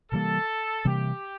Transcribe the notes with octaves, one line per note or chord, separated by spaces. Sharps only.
C3 E3 G3 A#3 A4
C3 E3 G3 A#3 G4